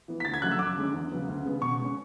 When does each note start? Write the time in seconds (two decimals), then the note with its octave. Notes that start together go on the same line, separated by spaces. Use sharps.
0.08 E3 B3
0.20 B6
0.25 D2 A6
0.34 G#6
0.42 C#3 F#3 A3 F#6
0.52 E6
0.59 F#2 D6
0.76 D3 G#3 C#4
0.94 E2
1.12 C#3 F#3 B3
1.28 D2
1.45 C#3 G#3 B3
1.62 B2 C#6
1.80 G#3 C#4